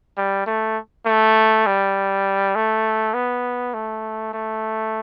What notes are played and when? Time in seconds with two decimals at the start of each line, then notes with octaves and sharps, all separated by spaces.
0.17 G3
0.46 A3
1.06 A3
1.66 G3
2.55 A3
3.14 B3
3.74 A3
4.33 A3